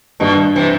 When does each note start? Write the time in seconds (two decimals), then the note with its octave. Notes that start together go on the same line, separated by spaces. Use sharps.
0.20 G2 B2 D#3 G3
0.56 C3 E3